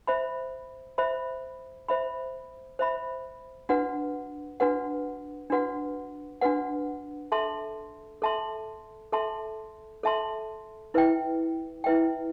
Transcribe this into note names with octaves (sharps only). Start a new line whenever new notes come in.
C5 E5 B5
C5 E5 B5
C5 E5 B5
C5 E5 B5
D4 F#4 B4 F#5
D4 F#4 B4 F#5
D4 F#4 B4 F#5
D4 F#4 B4 F#5
A4 E5 A5 C6
A4 E5 A5 C6
A4 E5 A5 C6
A4 E5 A5 C6
E4 B4 E5 G5
E4 B4 E5 G5